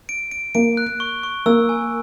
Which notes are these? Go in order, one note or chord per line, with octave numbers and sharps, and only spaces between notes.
D7
D7
A#3 D7
F#6
C#6
C#6
A#3 E6
G#5